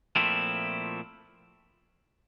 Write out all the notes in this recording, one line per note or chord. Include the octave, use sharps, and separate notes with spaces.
A#2 F3 A3 C4 E4